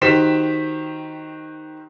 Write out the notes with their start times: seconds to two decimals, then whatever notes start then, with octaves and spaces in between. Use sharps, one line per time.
0.02 D#3 F#4 G4 C5 B6 E7